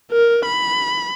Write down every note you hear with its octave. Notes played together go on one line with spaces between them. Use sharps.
A#4
B5